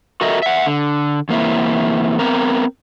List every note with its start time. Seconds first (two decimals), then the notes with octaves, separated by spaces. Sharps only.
0.21 F#4 A4 A#4 D#5 E5
0.42 E5 F#5
0.67 D3
1.29 E2 A#3 C4 E4
2.19 B3 C4 A#4